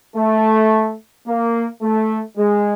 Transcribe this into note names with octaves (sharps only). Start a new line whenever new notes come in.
A3
A#3
A3
G#3